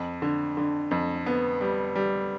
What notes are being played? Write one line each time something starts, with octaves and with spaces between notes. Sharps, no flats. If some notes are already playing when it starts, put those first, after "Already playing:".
Already playing: F2
D3
D3
F2
B3
G3
G3